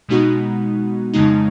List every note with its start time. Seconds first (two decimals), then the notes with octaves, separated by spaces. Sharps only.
0.09 B2 G#3 B3 D#4 F#4
1.13 F2 C#3 G#3 D#4